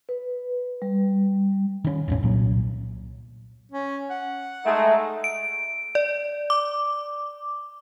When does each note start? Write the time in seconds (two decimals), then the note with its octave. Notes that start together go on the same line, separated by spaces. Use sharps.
0.09 B4
0.82 G3
1.85 D#3 C#4
2.08 E1 A1 C#4
2.23 C2 A#2 F#3
3.72 C#4
4.10 F#5
4.66 G#3 A3 D#4
5.24 D7
5.95 D5
6.50 D6